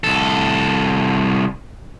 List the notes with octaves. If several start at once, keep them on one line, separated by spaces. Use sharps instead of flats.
C2 A4